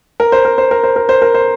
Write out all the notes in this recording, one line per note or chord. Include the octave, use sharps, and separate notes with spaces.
A#4
C5
A#4
C5
A#4
C5
A#4
C5
A#4
C5